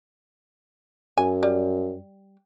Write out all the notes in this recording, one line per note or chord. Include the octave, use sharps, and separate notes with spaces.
F#2 G#5
G3